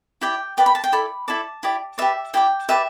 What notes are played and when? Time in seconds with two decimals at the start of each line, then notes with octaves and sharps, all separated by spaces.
0.21 E4 G4 D5 G5
0.57 G4 B4 D5 G5
0.66 B5
0.75 A5
0.84 G5
0.92 E4 A4 D5 B5
1.28 E4 A4 D5 A5
1.63 E4 G4 D5
1.98 G4 B4 D5 E5
2.34 E4 G4 B4 D5 G5
2.68 G4 B4 D5 E5